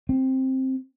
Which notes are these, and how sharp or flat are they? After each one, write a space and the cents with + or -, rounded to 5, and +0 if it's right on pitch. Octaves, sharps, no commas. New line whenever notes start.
C4 +10